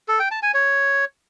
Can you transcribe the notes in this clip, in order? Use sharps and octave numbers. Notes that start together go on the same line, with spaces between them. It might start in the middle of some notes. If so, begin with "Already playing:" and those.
A4
G5
A5
G#5
C#5